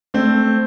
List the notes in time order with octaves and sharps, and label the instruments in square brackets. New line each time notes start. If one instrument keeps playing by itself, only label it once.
[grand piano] A3 C4